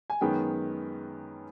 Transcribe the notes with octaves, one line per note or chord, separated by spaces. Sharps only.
G#5
F#2 D#3 G#3 B3 G5